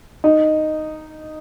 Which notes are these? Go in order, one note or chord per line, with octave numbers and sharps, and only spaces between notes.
D#4